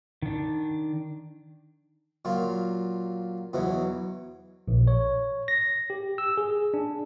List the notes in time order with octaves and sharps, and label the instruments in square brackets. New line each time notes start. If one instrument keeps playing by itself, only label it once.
[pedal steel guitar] D#3 D4
[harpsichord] A#2 F#3 F4
E2 B2 E3 F#3
[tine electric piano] A#1
C#5
A#6
G4
E6
G#4
D4